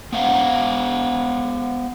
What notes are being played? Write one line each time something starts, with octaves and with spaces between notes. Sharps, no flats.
B3 C5 F5 F#5